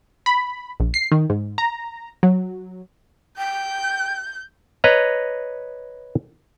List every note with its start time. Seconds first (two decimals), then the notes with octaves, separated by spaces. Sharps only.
0.26 B5
0.80 A#1
0.94 C7
1.12 D#3
1.30 G#2
1.58 A#5
2.23 F#3
3.38 G5 G6
4.84 B4 C#5 D#5 A#5